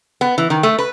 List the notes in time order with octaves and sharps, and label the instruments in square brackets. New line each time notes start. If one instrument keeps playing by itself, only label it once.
[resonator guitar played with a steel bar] B3
E3
D#3
A3
B4